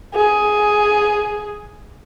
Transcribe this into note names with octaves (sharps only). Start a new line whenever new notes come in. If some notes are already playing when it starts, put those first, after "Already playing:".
G#4